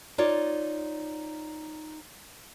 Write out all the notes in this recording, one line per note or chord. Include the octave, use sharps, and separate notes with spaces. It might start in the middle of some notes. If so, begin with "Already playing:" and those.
D#4 F4 C#5 D5